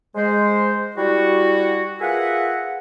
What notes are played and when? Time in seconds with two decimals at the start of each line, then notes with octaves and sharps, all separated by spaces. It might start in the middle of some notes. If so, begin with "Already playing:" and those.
0.15 G#3 C5
0.97 G3 E4 F#4
2.01 F4 G#4 A#4 B4 E5 F#5